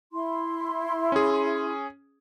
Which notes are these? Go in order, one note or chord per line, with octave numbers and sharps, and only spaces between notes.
E4 C6
C#4 G#4